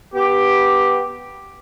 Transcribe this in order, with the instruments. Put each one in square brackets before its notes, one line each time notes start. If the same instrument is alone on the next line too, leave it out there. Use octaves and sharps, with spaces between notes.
[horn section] B3 G4